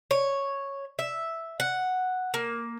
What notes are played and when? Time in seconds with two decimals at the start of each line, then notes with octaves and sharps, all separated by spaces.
0.11 C#5
0.99 E5
1.60 F#5
2.34 A#3